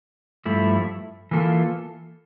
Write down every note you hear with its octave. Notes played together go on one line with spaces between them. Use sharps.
G2 F3 A3 E4
E3 A#3 F4 A4